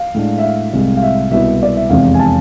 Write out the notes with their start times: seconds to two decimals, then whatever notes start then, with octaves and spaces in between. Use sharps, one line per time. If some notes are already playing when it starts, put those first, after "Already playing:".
Already playing: F5
0.14 A2 G#3 D4
0.38 E5
0.44 F5
0.73 C2 C3 G#3
0.97 F5
1.03 E5
1.31 C2 B2 B3 E4 E5
1.63 D5
1.77 E5
1.90 F1 E2 C3 G#3 C4 F5
2.14 G#5
2.19 A5